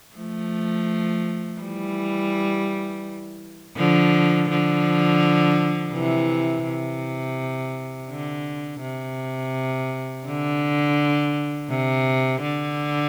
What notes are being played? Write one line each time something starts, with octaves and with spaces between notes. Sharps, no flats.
F3 A3
E3 G3
D3 F3
D3 F3
C3 E3
C3
D3
C3
D3
C3
D3